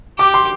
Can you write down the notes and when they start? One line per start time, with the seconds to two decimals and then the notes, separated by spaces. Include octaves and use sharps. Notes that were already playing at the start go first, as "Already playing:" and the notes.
0.19 G4 D6
0.34 C6